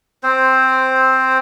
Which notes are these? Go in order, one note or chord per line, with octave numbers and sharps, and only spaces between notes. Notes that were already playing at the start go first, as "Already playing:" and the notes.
C4 C5